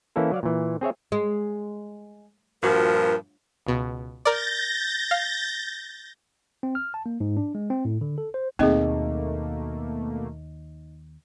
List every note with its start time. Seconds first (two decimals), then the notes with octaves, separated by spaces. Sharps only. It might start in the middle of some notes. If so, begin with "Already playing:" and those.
0.16 E3 A#3 C#4 E4 A4
0.32 F#3 D5 F5
0.43 A#2 E3
0.81 C4 G#4 C#5 E5
1.12 G#3
2.63 G2 A#2 F3 F#4 A#4
3.67 C#2 B2
4.25 A#4 D5 G6 A6 A#6
5.11 F5
6.63 C4
6.75 F6
6.94 A5
7.06 A#3
7.20 G#2
7.37 D4
7.55 G#3
7.70 C4
7.85 A2
8.01 D3
8.18 A4
8.34 C5
8.59 D#2 B2 A3 A#3 C4 D#4 G#4 D#5